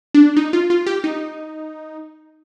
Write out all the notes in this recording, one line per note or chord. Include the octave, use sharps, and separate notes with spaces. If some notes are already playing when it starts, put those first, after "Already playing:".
D4
D#4
F4
F4
G4
D#4